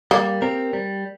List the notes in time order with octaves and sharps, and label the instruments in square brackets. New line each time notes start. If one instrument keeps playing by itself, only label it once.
[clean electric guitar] G3 [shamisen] A#3
[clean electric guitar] C4 G4 A#4
G3